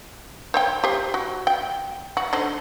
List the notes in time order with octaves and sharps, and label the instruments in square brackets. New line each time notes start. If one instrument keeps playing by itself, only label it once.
[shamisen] C5 C#5 G5
G4 C5
F#4
G5
F#4
D3 D#4 C5